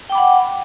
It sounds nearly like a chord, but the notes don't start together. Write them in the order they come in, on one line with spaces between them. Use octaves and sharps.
G5 D6 B5 F#5